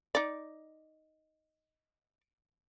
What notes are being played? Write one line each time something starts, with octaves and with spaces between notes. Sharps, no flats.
D#4 D5